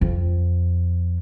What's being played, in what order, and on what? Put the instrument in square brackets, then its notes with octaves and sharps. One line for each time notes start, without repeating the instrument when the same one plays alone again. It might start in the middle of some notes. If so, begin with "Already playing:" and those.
[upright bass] F2